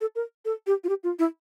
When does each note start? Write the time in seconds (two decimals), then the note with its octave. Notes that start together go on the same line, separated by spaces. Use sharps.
0.01 A4
0.15 A#4
0.45 A4
0.67 G4
0.84 F4
0.89 G4
1.04 F4
1.19 E4